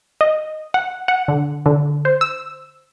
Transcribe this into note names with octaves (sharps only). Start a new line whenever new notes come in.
D#5
F#5
F#5
D3
D3
C5
E6